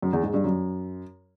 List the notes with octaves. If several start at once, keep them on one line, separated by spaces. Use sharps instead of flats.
F#2
E2
G#2
G2
F#2